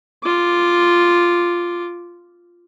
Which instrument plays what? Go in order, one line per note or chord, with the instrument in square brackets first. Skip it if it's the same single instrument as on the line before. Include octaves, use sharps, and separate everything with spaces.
[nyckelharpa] F4 D6